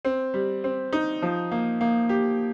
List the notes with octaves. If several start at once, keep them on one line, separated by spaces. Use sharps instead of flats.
C4
G3
C4
D#4
F3
A#3
A#3
G4